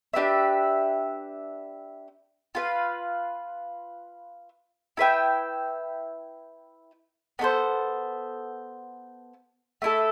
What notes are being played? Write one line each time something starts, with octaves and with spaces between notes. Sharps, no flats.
D4 G4 B4 E5
F4 B4 F5
E4 B4 E5 G5
B3 D4 A4 C5
A3 E4 A4